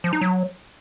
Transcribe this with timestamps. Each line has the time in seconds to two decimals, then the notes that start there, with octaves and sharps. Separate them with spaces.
0.04 F3
0.13 D#4
0.21 F#3